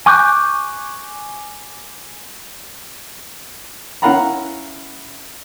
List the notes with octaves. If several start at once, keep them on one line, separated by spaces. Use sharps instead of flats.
G#5 C#6 D6 F#6 G6
C#4 E4 F5 F#5 A#5 B5